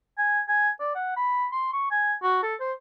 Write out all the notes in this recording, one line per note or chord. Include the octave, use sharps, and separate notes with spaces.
G#5
G#5
D5
F#5
B5
C6
C#6
G#5
F#4
A4
C5